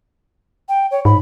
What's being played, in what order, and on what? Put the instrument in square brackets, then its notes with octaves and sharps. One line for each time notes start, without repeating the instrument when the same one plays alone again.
[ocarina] G5
C#5
[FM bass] G#2 [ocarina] B5